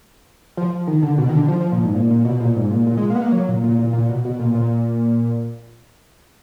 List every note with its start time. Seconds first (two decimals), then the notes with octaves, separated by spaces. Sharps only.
0.57 F3
0.87 D#3
1.03 D3
1.18 B2
1.29 D#3
1.34 D3
1.48 F3
1.61 F3
1.72 A#2
1.83 G#2
1.95 A#2
2.11 A#2
2.25 B2
2.40 A#2
2.56 G#2
2.71 A#2
2.87 A#2
2.97 G#3
3.10 A#3
3.16 B3
3.22 A#3
3.32 F#3
3.48 A#2
3.64 A#2
3.79 A#2
3.93 A#2
4.09 B2
4.25 B2
4.40 A#2
4.55 A#2